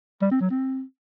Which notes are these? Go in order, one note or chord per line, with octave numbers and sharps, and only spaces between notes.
G3
C4
F#3
C4